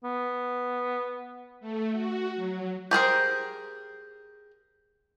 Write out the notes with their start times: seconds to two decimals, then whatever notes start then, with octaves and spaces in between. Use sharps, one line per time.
0.04 B3
1.60 A3
1.92 F#4
2.35 F#3
2.91 G4 G#4 A#4 C5